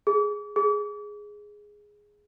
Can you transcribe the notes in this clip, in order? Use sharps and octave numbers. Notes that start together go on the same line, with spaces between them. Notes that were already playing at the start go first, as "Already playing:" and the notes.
G#4
G#4